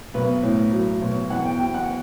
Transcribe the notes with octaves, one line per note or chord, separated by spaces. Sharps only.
B1 B4
A2
F#3
B1
E2 F#5
G5
B2 G5
F#5